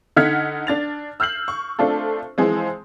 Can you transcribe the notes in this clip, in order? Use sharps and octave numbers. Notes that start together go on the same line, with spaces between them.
D3 D#4 F#5 F6 G#6 B6
D4 A6 F7
E6 F6 G6 C7 F#7
C#6
A3 C4 D4 F4 A4
E3 F3 G#3 C4